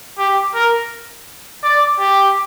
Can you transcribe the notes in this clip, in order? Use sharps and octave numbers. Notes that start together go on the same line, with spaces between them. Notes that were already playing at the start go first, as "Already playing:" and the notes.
G4
A#4
D5
G4